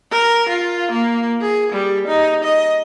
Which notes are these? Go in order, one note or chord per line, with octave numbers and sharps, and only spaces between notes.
A#4
F4
A#3
G#4
G3
D#4
D#5